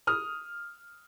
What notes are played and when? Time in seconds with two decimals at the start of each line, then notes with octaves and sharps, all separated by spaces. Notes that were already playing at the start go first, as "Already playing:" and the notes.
0.07 D#6 F6